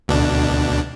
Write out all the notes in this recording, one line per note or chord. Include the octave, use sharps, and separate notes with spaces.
D2 B2 D4